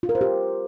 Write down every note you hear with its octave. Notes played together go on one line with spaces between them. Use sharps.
F4
A#4
C5
G4